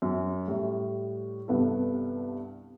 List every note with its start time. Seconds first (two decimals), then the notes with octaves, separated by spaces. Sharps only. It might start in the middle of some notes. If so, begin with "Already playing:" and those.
0.02 F#2
0.48 A2 G3
1.48 C2 G2 B3 A4